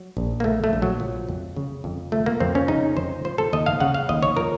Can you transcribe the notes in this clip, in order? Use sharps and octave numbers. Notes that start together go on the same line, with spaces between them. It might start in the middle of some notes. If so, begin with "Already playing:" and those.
Already playing: F#3
A#1
A#3
A2 A3
A3
A#1
F#3
F3
F2
C#3
F2
F3 A3
A#3
F2 C4
C#4
C#3 D#4
F2 C5
F3 C5
A4
D#2 D#5
F5
C#3 F#5
F5
D#2 D#5
C#5
F3 A#4